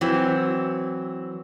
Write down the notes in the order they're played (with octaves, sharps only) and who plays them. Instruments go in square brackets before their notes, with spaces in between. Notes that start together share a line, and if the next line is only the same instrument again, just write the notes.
[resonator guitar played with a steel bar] E3 F#3 C4